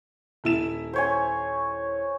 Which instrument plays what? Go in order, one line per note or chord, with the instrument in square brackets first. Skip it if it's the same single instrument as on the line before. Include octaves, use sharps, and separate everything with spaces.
[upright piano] D#1 E4 E7
[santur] C5 C#5 G#5